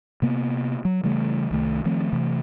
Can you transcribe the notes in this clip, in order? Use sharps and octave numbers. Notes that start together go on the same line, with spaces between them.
C3 A#3 B3
F#3
C#3 E3 G3 A3
C2 D#3 A3
D#3 F3 A3 C4
C3 E3 A3